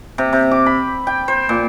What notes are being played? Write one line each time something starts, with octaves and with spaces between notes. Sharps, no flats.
C3
C3
D6
B5
G5
C5
A#2